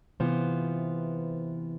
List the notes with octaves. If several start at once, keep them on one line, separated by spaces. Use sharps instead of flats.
C3 E3 B3 F4 C5